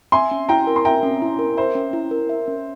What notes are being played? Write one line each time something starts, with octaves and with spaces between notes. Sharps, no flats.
E5 G#5 C6
C#4
E4 G5 A#5
A#4
C6
E5 G5 A#5
C#4
E4
A#4
C5 E5
C#4
E4
A#4
E5
C#4